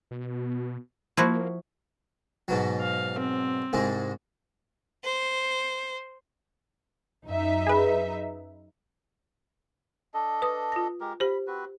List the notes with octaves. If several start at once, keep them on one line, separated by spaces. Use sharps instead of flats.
B2
F3 A#3 E4 F#4
G#2 B2 F#3
F5
C4
C2 G#2 G#3
C5
F#2 D#4 E5
G#4 B4
D4 A4 D#5
B4 D#6
F4 A#6
G#3 G4 A#4
G4 C5 B5
C4 F#4 B4